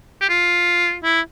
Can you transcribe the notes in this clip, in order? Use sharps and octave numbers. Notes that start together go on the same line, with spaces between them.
G4
F4
E4